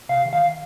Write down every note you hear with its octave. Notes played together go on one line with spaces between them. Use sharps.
C3 F5
D#3
F5